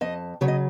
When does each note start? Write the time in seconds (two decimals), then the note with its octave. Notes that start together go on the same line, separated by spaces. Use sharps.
0.01 F2 D#5
0.41 C#3 F#3 C#5
0.48 D#5